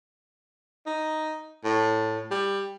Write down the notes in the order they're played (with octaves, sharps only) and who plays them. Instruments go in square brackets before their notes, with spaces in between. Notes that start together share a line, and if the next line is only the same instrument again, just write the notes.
[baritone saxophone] D#4
A2
G3